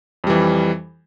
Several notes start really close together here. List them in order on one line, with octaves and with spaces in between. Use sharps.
F2 G3 E3